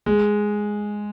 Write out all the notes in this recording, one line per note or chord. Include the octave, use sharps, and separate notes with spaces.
G#3